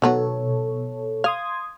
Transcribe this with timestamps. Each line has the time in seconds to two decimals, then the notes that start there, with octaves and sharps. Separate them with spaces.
0.02 B2 D#3 F#3 B3 A4 C#5
1.24 F5 C6 D#6 G#6